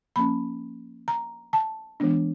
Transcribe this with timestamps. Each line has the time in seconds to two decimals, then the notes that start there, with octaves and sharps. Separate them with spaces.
0.16 F3 A#3 C#4 B5
1.08 A#5
1.53 A5
2.00 E3 G#3 B3 D4